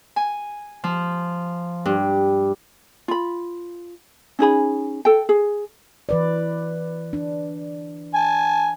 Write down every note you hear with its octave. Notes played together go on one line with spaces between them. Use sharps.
G#5
F3
G2
F4 B5
C#4 D#4 G#4 B5
A4 G5
G#4
E3 B4 D5
D4
G#5 A5